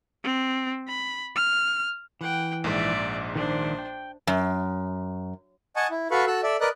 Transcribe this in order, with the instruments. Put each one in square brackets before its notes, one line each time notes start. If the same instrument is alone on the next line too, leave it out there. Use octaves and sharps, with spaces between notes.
[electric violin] C4
B5
F6
[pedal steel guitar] E3 [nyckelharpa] F#5 G5
[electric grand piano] A#1 G#2 [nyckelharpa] D5 E5
[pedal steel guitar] D#3 D5 [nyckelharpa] D4 C5
[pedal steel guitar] G5
[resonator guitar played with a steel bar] F#2
[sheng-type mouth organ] D#5 F#5 G#5 A5 C#6
E4
F#4 A4 B4 F5 B5 C#6
F#4 A4 E6 F#6
A4 D5 E5
A#4 B4 D5 D#5 F#6